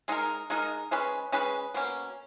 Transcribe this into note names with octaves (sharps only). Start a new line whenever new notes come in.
G#3 D#4 A#4
G#3 D#4 A#4
G#3 C#4 G#4 B4
G#3 C#4 G#4 B4
B2 A#3 C#4